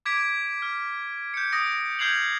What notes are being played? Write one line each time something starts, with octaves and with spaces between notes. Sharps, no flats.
D6 G#6 B6 D7
F6
G6 C#7
D#6 A#6 D7
F6 G6 G#6 C7 F7 F#7